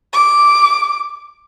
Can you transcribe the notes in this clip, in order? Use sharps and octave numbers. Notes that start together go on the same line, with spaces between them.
D6